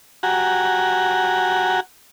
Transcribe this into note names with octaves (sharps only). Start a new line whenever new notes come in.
F#4 G4 F#5 G#5 A#5